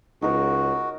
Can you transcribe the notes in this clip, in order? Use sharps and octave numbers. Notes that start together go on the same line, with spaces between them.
C#2 D#4 F#4 A#4 C#5